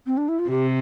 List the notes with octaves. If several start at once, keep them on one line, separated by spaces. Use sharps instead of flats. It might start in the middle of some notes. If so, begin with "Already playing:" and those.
C4
D4
E4
F4
C3 G4